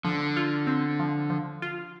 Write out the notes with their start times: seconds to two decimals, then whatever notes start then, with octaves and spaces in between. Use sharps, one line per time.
0.05 D3 F3
0.37 F4
0.67 C4
1.00 F3
1.30 F3
1.62 F4